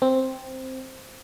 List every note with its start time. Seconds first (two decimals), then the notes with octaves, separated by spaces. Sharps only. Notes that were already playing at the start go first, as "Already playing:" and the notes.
0.02 C4